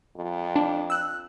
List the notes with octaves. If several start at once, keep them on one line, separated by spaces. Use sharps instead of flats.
F2
D4
E6 F#6